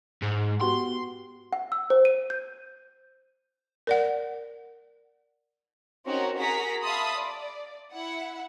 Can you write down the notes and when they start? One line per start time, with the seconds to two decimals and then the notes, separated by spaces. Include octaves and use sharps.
0.23 G#2
0.61 B3 F#4 G4 C6
1.53 F#5
1.72 E6
1.90 C5
2.05 D#7
2.30 G6
3.87 A#4 D5 F#5
6.06 C4 C#4 D#4 F#4 A#4
6.37 F#4 G#4 A#4 F#5 A#5 B6
6.83 E5 F5 A5 B5 C6 D#6
7.17 D5
7.92 E4 F#5